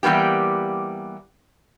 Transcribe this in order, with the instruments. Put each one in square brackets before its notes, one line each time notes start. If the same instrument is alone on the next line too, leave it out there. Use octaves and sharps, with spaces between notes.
[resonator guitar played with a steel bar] E3 G3 A#3 B3 G4